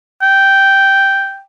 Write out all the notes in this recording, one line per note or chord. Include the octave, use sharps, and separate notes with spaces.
G5